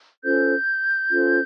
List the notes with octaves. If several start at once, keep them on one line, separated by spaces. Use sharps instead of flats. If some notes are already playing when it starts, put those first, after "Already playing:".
C#4 F4 A4 C5 G6
C#4 F4 A4 C5